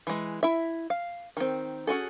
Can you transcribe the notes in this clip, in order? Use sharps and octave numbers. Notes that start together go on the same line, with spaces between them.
E3 G#3
E4 E5
F5
D#3 C4
C#4 F#4 G#4 A4